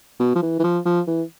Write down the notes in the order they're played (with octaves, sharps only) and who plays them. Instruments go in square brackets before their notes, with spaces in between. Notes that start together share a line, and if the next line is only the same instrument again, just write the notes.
[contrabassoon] B2
F3
E3
E3
F3
F3
E3